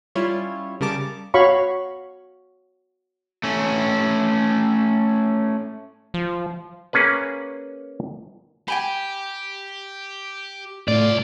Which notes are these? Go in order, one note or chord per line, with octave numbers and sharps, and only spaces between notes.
G3 C#4 E4 F4 C#5
C#3 G3 A#4 A5 D6
F#4 C#5 F5 B5 C#6
A3 C#4
F3
A#3 C#4 G#4 B4
G4 G5 G#5 B5
C2 A2 F4 D5